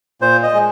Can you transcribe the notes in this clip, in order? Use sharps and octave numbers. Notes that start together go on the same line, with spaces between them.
A#2 C5
D#5
G#3